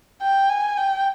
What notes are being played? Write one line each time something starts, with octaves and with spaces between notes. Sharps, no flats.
G5
G#5
G5